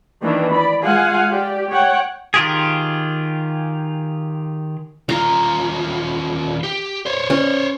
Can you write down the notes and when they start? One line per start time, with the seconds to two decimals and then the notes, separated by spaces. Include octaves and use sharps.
0.23 D#3 E3 A#3 D4
0.52 D5 B5
0.84 G#3 F4 F5 F#5 G#5
1.33 G4 D5
1.69 C#5 F#5 G5
2.34 D#3 F4 G4 G#4
5.09 D#2 F4 A#5
6.63 G4
7.06 C5 C#5
7.30 C#4